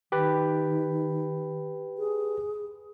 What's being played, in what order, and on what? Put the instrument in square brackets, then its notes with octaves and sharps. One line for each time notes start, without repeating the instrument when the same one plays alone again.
[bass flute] D#3 [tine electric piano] G4 B4
[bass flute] G#4